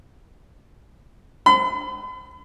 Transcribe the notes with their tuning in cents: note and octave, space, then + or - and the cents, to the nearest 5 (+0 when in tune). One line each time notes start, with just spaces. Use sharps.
B5 +45